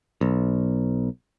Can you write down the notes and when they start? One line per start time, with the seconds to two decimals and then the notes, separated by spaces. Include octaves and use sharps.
0.21 B1